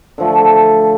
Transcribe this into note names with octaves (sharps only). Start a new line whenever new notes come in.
D3 F3 A3